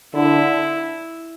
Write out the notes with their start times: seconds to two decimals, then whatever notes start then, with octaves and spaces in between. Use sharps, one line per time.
0.14 D3 E4